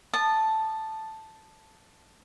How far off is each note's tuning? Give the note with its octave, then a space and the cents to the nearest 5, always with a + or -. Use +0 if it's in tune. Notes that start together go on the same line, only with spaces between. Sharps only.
A5 +0 D#6 -30